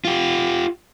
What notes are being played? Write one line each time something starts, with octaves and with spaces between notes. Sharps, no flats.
F4 G4